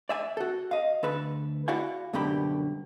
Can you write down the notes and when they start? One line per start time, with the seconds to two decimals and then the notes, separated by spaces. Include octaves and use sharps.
0.09 D5 E5 G#5
0.37 F#4 A4
0.71 D#5 F5
1.03 D2 A4 B4
1.68 E4 F#4 D5 F5 F#5 G#5
2.13 C2 F#2 B2 D3 G4 B5